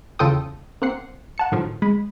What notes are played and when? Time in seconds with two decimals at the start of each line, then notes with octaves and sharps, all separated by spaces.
0.19 E2 C#3 F4 A4 G5 D#6
0.82 A#3 C4 F#5 C7
1.38 F#5 A5 C#7
1.52 A2 D3 D#3 F3 F#3
1.82 G#3 B5